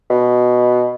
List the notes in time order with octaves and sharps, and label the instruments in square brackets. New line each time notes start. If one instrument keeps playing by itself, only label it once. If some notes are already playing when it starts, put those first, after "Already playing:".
[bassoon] B2